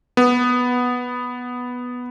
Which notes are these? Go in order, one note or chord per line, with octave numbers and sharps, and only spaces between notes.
B3